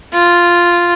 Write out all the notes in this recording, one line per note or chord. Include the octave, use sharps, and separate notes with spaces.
F4